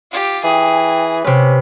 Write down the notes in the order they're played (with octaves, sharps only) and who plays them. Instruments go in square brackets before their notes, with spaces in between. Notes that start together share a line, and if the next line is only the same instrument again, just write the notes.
[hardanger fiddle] F4 G4
[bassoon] E3 [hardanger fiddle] G#4 [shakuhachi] G5
[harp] C3 B4 [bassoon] C#4 [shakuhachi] G4